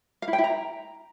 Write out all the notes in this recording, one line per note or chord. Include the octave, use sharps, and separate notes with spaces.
F5
E4
G5
E4
A#5